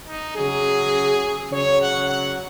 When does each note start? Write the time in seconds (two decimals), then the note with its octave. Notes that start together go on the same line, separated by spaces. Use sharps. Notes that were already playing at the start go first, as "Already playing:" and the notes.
0.08 D#4
0.37 C#3 F#3 G#4
1.52 C#3 F#3 C#5
1.80 F#5
2.09 F#5